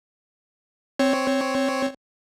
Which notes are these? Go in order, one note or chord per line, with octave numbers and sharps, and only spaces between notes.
C4 C#5